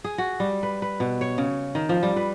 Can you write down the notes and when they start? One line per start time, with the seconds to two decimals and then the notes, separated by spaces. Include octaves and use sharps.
0.04 G#4
0.18 F#4
0.40 G3
0.63 B4
0.82 B4
1.00 B2
1.21 C#5
1.38 C#3
1.75 D#3
1.89 F3
2.03 G3
2.16 B4